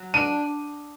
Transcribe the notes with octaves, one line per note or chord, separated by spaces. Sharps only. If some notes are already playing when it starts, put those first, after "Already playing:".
Already playing: F#3
D4 D#7